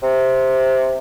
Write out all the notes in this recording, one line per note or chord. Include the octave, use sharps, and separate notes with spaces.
C3